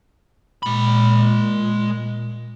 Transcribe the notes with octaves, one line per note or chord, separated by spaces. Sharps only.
A#2 G#3 B5